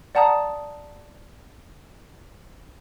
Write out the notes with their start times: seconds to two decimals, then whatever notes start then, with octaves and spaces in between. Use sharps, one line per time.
0.15 D5 F#5 A5 A#5 D#6